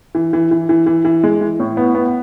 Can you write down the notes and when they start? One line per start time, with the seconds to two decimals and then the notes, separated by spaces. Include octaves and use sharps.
0.15 E3
0.33 E3
0.51 E3
0.69 E3
0.86 E3
1.05 E3
1.24 G#3
1.41 E3
1.60 A2
1.77 B3
1.95 B3